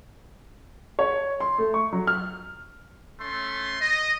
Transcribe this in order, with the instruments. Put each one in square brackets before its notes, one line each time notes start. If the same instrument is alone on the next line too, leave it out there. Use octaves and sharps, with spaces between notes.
[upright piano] C#5
C6
A3
C#6
F#3
F6
[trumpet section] A3 C#4 C6
D#5